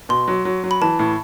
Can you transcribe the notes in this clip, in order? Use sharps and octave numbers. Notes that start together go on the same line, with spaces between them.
B2 C6
F#3
F#3
F#3
B5
E3 A5
A2